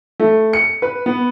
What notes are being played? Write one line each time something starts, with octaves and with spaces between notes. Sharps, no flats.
A3
C#7
B4
B3